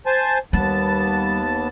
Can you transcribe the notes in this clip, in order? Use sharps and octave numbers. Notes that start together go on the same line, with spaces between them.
C5 G#5 A5
D#2 G3 B3 A5